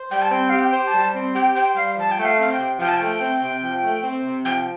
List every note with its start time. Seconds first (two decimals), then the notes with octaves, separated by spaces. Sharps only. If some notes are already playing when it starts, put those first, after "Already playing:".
Already playing: C5
0.10 G3 G5
0.21 A5
0.30 C4 G5
0.49 G4 F5
0.59 G5
0.72 C5
0.86 A5
0.93 G3
1.13 C4
1.34 G4 G5
1.55 C5 G5
1.75 G3 F5
1.96 F3 A5
2.11 G5
2.17 A3
2.24 F5
2.38 C4 F5
2.52 G5
2.58 C3
2.79 F3 G5
2.88 A5
2.96 A3 G5
3.20 C4
3.41 C3
3.62 F3
3.83 A3
4.03 C4
4.24 C3
4.44 F3 G5